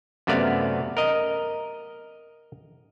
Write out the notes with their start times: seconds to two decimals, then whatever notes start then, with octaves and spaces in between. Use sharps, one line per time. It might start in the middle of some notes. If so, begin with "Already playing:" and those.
0.27 F#2 C3 A3 B3 D5 F5
0.97 A#4 D#5